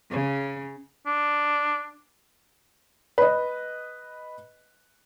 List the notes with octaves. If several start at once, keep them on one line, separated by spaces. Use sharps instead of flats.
C#3
D4
B4 D#5